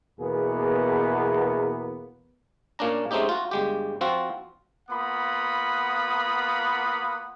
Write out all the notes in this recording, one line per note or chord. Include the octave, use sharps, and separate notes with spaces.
E2 B2 A#3 B3 G#4
A#2 A#3 C#4 D4 A#5
G#3 A3 C4 C#4 D#4 G4
F4 F#4
G1 G#3 G4
F3 C4 F4 F#4
A#3 B3 F4 F#5 B5 D#6